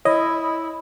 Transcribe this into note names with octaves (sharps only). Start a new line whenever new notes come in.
E4 C#5 D#5